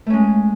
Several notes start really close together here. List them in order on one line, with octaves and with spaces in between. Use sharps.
A3 C#4 G#3